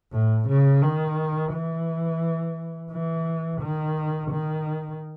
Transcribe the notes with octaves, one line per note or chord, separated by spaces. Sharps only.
A2
C#3
D#3
E3
E3
D#3
D#3